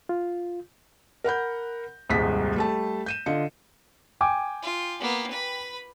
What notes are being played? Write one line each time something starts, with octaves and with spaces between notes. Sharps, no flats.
F4
A#4 F#5 B5 G6
D#1 C2 G#2 G#3 B6
G3 A3 A5
G6 D#7 E7
D3 F4 D#5 C#7
G5 G#5 D6
F4
A#3 B3
B4 B5